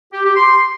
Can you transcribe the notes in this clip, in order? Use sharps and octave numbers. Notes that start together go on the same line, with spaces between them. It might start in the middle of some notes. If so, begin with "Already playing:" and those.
G4
G4
C6